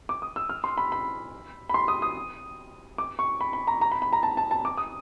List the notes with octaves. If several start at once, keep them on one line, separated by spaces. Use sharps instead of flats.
D6
D#6
E6
F6
C6
B5
B5
B5
C6
D#6
D#6
D6
C#6
B5
B5
A#5
A#5
B5
B5
A#5
A5
A5
A5
D6
D#6